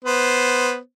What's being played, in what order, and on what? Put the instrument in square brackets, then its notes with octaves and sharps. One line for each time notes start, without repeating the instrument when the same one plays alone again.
[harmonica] B3 C5